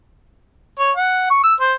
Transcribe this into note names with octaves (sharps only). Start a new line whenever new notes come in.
C#5
F#5
C#6
E6
C5